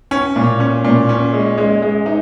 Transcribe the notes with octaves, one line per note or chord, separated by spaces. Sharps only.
C#4
A#2
C#4
A#2
C#4
G#3
G#3
G#3
D#4